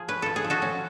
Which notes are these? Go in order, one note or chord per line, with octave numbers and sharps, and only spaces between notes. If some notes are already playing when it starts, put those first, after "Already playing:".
Already playing: F3 G#4
C#4 B4
F3 A4
G#4
F3
F#4 A4
C#4